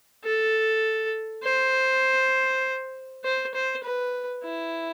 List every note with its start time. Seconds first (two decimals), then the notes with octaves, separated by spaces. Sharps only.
0.24 A4
1.44 C5
3.24 C5
3.54 C5
3.84 B4
4.44 E4